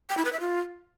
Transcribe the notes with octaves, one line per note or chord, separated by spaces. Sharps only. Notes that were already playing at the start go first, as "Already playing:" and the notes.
G5
E4
B4
E5
F4